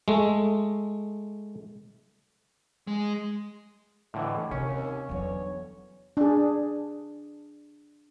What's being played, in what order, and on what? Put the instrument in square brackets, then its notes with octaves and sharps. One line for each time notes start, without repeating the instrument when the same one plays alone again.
[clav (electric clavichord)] G#3 A3
[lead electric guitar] G#3
[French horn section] D2 D#5 [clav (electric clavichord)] A2 D3 E3
[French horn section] D#2 [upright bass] C3 [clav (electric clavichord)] C#4
[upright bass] E2 F#3 [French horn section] D3 B3 C#5
[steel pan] D4 G#4